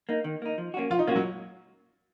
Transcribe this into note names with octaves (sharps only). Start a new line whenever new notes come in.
A#3 D#4
D#3
A#3 D#4
F3
A#3 C#4 F#4
F3 F4
D#4
A#3 C#4 F4 F#4
F#3